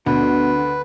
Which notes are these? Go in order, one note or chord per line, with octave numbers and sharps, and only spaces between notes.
D2 B2 D3 B4